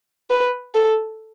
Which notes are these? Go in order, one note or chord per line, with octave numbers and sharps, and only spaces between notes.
B4
A4